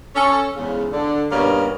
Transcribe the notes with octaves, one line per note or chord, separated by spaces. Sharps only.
C#4 A4
E2 G#2 C#3
D3
G2 B2 A#3 C#4